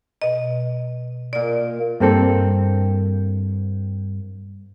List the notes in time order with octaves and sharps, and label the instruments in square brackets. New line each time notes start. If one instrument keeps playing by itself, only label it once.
[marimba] B2 D#5
[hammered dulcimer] A#2 D#5 [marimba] D5
[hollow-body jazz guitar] G2 A#3 C4 A4